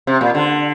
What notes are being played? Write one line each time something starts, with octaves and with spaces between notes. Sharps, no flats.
C3
A#2
D3